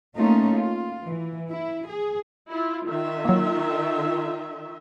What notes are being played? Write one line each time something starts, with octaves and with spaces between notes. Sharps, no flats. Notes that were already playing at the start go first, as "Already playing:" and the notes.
A3 A#3 C#4 D#4 F4
F4
E3
E4
G#4
E4 F4
D#3 F4 E5
F#3 A#3